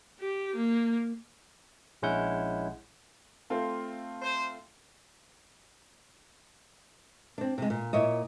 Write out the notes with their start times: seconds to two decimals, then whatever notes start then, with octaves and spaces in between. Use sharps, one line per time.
0.20 G4
0.55 A#3
2.02 A#1 G#3 C#4 E4 F#5 G6
3.50 A3 C4 F4
4.22 C5
7.38 C4 D4
7.58 C3 G#3
7.70 A#2
7.93 A#2 E4 C#5 D#5